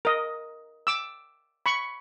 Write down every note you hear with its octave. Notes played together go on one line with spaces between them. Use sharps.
A#4 D#5
D6 E6
B5 C#6